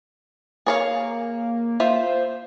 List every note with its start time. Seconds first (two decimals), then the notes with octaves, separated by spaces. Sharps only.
0.66 A#3 G#4 C#5 F5
1.80 F4 C5 E5